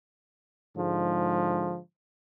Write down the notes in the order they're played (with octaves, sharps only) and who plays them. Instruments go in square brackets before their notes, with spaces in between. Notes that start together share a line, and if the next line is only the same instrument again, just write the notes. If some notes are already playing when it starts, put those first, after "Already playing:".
[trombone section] G#2 D3 F3 G#3